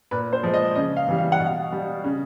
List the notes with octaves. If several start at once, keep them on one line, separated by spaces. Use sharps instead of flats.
A#2 B4
C5
F3 G#3
D#5
C#3 D#5
F5
E3 G3
F5
F#5
B2
F5
G3
C#3